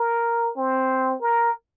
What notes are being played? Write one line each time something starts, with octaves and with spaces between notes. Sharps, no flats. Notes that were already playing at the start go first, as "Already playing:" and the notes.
Already playing: A#4
C4
A#4